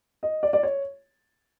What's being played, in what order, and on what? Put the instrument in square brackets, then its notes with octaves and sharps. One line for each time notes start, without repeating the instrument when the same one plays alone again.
[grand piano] D#5
D5
D5
C#5